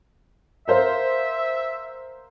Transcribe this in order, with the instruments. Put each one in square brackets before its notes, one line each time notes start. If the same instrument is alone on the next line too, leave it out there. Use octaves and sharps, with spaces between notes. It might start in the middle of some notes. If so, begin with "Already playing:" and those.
[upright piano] A#4 C5 F5 [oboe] E5